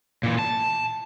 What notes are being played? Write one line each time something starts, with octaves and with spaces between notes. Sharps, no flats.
A#2 E3
A5